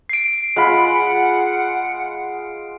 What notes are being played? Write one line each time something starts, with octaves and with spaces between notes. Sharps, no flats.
C7 D7
G#3 F4 F#5 B5